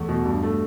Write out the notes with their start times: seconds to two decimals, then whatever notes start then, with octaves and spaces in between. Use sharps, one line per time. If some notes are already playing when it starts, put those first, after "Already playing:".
Already playing: E2 A3
0.09 B2
0.26 G2
0.43 A3